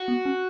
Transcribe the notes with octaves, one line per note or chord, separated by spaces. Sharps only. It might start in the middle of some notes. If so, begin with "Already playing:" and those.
Already playing: F#4
B3
C#4